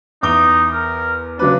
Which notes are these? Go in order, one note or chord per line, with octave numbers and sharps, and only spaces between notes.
E2 D#4 D6 G7
A#4
C#3 F#3 D4 B4